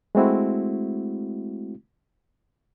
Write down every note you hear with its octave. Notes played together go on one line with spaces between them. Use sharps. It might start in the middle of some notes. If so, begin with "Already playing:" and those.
G#3 A3 C4 E4 F#4